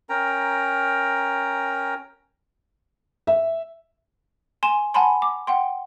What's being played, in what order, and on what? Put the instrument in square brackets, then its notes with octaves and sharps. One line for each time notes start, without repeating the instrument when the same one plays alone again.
[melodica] C#4 A#4 G5 A#5
[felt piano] E5
[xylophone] G#5 C6 E7
F#5 G#5 A5 B5 C6
D6
F#5 G5 C6